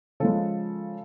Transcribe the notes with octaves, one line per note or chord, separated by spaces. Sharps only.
C#3 F3 G#3 A4